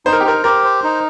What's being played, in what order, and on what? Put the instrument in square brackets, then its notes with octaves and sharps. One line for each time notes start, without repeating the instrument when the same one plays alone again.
[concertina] D#4 [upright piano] C5
[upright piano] A#4
G4
[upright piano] A#4 [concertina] C5
[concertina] G4 [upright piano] A#4
[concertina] C5
D#4